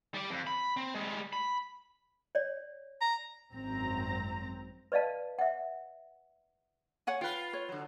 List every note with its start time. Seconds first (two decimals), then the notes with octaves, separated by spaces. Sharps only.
0.14 G3 D5
0.30 F2
0.47 B5
0.77 C4
0.95 G3 G#3
1.33 B5
2.35 C#5 D5
3.01 A#5
3.52 G#1 F#2 C4 A#5
4.92 B4 D5 D#5 F5 A5
5.39 E5 F#5
7.07 C#5 F#5 G#5
7.21 F4 B4 G5
7.53 C#5
7.69 D3 F#3